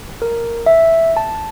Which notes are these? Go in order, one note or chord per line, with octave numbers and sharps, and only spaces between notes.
A#4
E5
A5